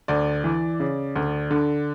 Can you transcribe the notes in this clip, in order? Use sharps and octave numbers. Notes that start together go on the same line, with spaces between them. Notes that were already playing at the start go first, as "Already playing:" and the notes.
D2 D5
E3
C#3
D2
D3